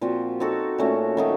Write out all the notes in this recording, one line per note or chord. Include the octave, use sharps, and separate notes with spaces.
A#2 F3 C4 F#4
C4 D#4 F#4 A4
A#2 A3 C#4 F#4
D#3 F#3 A3 D#4